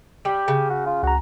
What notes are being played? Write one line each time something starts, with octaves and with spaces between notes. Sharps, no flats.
G3 G4
C#3
F#4
F4
C#2 F#4 A#5